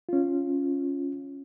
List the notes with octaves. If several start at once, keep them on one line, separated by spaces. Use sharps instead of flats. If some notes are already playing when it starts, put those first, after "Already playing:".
C#4 F4